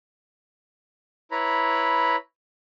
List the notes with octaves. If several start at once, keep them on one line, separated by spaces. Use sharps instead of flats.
E4 B4 C#5 A#5 B5